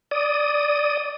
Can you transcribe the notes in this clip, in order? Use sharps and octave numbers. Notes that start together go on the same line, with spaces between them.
D5 D#6